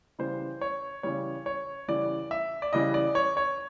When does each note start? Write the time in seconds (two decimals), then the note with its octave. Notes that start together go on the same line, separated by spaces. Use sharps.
0.19 C#3 E3 G3 C5
0.61 C#5
1.03 C#3 E3 G3 C#5
1.46 C#5
1.88 C#3 E3 G3 D5
2.31 E5
2.62 D5
2.73 C#3 E3 G3 D#5
2.94 D5
3.15 C#5
3.37 C#5